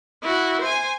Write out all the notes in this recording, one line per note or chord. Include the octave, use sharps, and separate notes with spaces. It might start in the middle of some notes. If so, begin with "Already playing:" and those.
E4 F#4
C5 G#5